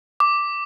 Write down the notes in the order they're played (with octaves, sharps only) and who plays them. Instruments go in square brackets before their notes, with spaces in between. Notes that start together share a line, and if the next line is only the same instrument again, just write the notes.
[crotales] D6